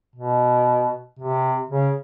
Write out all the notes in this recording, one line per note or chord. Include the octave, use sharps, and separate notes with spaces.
B2
C3
C#3